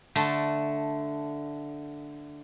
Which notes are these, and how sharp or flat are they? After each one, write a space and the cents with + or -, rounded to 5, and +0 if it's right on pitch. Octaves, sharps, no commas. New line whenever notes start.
D3 +0 A3 -5